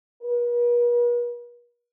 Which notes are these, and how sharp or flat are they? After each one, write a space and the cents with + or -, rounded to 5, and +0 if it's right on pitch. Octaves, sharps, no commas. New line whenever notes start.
B4 -45